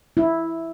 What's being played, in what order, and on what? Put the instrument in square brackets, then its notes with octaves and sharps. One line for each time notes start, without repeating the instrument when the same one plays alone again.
[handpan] E4